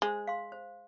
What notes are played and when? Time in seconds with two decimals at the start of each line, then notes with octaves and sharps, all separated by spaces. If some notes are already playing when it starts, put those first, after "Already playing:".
0.02 G#3 C5
0.27 F5 C6
0.52 C5